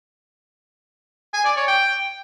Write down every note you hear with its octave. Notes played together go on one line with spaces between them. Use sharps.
G#5
D5
C#5
G5